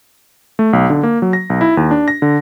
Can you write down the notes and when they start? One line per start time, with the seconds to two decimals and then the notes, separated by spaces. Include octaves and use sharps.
0.59 A3
0.73 B1
0.90 D3
1.03 A#3
1.22 F#3
1.33 A#6
1.50 B1
1.61 E4
1.77 D#2
1.91 D4
2.08 A#6
2.22 D3